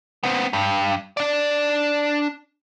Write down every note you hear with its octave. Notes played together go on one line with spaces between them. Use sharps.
B3 C4
G2
D4 D5